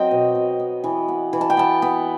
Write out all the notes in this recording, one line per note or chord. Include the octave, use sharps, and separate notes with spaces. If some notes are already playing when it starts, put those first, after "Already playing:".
Already playing: F#3 C4 D#5 G5
B2
B2
B3
E3
B3
E3
A5
G5
B3 A5
B3